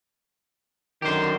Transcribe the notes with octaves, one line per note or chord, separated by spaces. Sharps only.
F#2 D3 D#3 G4 C5